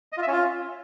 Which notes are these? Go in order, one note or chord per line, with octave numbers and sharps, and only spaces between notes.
D#5
F4
E5
C#4
F4